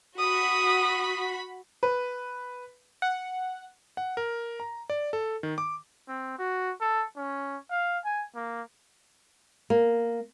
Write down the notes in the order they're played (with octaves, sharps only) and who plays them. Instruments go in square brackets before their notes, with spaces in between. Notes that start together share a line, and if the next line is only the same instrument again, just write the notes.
[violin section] F#4 B5 [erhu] D#6
[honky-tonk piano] B4
[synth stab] F#5
[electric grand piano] F#5
A#4
A#5
D5
A4
D#3
D6
[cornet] C4
F#4
A4
C#4
F5
G#5
A#3
[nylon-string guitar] A#3